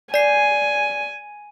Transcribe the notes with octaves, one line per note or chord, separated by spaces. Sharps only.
D5 G#5 C7